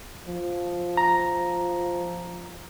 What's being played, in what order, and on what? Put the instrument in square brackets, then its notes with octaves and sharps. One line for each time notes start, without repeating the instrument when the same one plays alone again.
[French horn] F3
[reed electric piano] A#5